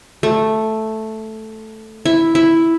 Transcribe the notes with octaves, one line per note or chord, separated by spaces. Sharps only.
A3
E4
E4